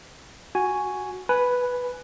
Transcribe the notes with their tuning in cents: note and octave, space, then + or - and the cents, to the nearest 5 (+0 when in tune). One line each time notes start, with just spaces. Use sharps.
F#4 +0 G#5 +0
B4 +0 G#5 +15